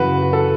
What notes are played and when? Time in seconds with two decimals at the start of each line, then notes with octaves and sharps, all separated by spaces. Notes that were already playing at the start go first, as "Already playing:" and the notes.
Already playing: F#2 C#3 E3 F#4 B4
0.22 F#4
0.33 A4